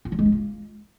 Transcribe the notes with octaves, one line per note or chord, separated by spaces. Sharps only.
F4
F#3
G#3
D#4
F4